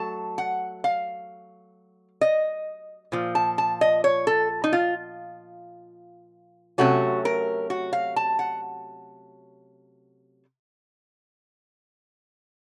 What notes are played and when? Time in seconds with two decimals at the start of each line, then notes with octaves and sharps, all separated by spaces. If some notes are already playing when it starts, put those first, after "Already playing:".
Already playing: F#3 A3 A5
0.38 F#5
0.84 F5
2.21 D#5
3.12 A#2 F3
3.35 A5
3.58 A5
3.81 D#5
4.04 C#5
4.27 A4
4.64 D#4
4.73 F4
6.78 C3 F#3 A3 C#4 F#4
7.25 A#4
7.70 F#4
7.93 F5
8.16 A5
8.39 F#5